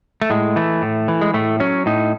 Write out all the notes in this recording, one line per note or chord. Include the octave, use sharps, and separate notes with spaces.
A3
A2 G#3
E3 A3
A2
E3
G#3
A2 A3
F#3 C#4
A2 D#4